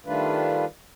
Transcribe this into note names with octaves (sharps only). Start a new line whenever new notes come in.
D#3 G3 A3 D4 F4 B4